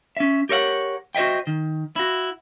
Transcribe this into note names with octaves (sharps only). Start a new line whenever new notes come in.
C#4 E5
G4 A#4 C#5 E5 F#5
F#4 C5 D#5 E5 G5
D#3
E4 F#4